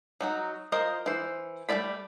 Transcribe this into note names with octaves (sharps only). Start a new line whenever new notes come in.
F#3 D#4 F#4
F4 A#4 C5 D#5
E3 C5
G3 A3 C4 D5 B5